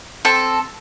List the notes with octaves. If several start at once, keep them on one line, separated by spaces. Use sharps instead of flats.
C4 A4